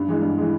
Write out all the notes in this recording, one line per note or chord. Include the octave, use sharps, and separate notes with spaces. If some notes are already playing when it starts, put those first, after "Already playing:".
Already playing: G2
E3 G#3
G2
E3 G#3